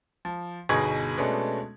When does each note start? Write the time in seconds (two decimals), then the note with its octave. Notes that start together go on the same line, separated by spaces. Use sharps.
0.25 F3
0.69 G1 B2 D#4 G#4 C#6 G#6
1.17 B2 G#3 A3 B3 C#4 D4